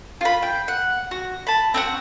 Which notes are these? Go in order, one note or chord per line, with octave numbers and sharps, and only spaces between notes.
F4 B5
G5
F#5
F#4
A5 B5
C4 D4 F#4